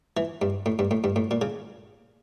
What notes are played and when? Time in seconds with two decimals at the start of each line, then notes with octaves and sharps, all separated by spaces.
0.17 E3
0.42 G2
0.66 A2
0.79 G2
0.91 A2
1.04 G2
1.16 A2
1.31 A#2
1.42 C#3